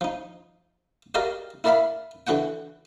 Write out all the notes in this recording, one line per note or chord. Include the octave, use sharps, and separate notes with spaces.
F3 D#4
F#4 G4 A#4 D5 D#5 F5
E4 A#4 D5 E5 F5 B5
D3 E3 F#4 F#5 G5